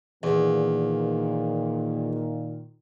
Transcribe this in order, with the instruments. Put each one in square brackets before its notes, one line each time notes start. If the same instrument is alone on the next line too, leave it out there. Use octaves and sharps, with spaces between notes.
[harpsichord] E2 [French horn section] A#2 D#3